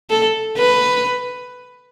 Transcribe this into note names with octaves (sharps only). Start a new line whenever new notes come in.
A4
B4